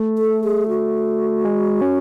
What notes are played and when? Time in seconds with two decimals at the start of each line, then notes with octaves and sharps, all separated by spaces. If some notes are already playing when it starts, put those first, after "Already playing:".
Already playing: A3
0.18 A4
0.44 G#4
0.68 F#4
1.45 G#3
1.81 C#4